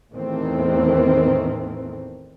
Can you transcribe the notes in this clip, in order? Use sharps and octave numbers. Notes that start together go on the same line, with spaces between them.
E2 A2 D#3 E3 A3 C4